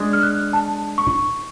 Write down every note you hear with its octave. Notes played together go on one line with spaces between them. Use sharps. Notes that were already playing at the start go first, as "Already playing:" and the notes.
Already playing: G#3 D4
F6
F#6
A5
C#6